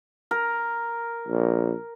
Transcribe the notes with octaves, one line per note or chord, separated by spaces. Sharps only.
A#4
A#1